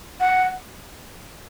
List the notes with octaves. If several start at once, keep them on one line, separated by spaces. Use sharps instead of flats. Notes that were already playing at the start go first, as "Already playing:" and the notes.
F#5